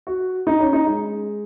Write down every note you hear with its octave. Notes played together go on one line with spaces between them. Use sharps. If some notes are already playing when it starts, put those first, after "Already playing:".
F#4
D#4
C#4
D#4
G#3